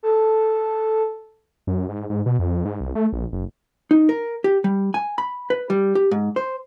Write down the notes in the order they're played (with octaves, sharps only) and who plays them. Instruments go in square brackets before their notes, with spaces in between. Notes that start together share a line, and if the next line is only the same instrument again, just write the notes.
[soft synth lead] A4
[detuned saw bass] F#2
G#2
G#2
B2
F2
G#2
C2
A3
A#1
F#1
[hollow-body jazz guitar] D#4
A#4
G4
G3
G#5
B5
B4
G3
G4
G#2
C5